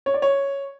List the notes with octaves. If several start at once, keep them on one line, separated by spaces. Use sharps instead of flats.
C#5
D5
C#5